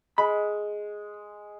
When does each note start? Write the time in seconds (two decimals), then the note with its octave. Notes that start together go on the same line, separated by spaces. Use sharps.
0.18 G#3 B5